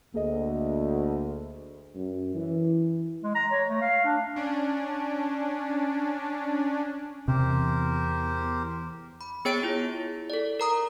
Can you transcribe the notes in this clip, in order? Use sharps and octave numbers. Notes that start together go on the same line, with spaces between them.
D2 A#3 G#4 D#5
F#2
E3
G#3
A#5
C#5
A3
F5
D4
C#4 D4
E2 C3 G4 A#4 C5
B5
B3 G#4 C#5 G5 A6 D7
E4 F4
A4 D5
A#4 A#5 D#6